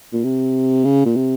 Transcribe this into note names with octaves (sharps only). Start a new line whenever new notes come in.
A#2
C3
C#3
A#2
C3